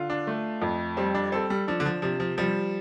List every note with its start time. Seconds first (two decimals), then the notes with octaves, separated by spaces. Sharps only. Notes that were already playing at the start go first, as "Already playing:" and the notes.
Already playing: D3 F4
0.10 D4
0.27 A3
0.62 F2
0.97 G3 C4
1.15 D4
1.32 C4 A4
1.50 G3
1.67 F3 D4
1.80 D3
1.86 F3
2.02 C3 F3
2.20 F3
2.38 F3 G3